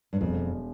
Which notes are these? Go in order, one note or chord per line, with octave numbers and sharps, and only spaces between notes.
G2
E1 F2